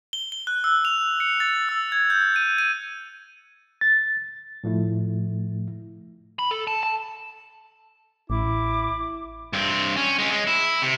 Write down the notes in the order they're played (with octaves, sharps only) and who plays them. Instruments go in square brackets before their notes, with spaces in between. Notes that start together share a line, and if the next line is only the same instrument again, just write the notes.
[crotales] G7
G7
F#6
E6
F7
C#7
A6
E6
G#6
G6
D#7
D#7
[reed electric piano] A6
A2 F3 A3 E4
[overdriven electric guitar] B5
A4
A5
A5
[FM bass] A1 [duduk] E4 [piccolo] D6
[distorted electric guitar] G2 C4
C#4
G#3 C#4
G#3
E4
C3